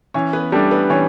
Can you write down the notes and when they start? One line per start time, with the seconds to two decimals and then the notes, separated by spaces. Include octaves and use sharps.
0.14 E3 C#4 C#5
0.33 B3 B4
0.52 G3 A3 D4 A4
0.71 B3 B4
0.90 E3 C#4 C#5